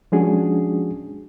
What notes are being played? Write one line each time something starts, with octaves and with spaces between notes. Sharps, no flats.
F3 G#3 C#4 D4 F#4 G#4